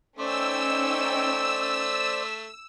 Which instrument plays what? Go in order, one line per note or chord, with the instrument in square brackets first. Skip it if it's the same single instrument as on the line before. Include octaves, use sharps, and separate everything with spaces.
[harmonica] A3 [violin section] C#4 D#4 G5 [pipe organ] C5 D5 [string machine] E6